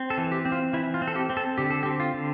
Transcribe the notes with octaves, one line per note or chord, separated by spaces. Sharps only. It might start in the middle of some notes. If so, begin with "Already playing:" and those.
Already playing: C4
A4
E3
G4
C4
F4
E3 E4
F4
C4
A4
G4
C4
A4
D3 G4
A4
G4
C4
F4
D3